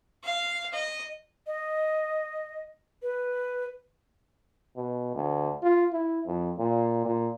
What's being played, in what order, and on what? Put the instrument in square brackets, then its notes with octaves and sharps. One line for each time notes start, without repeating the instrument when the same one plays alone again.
[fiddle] F5
D#5
[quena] D#5
B4
[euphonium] B2
D2
F4
E4
F2
A#2
A#2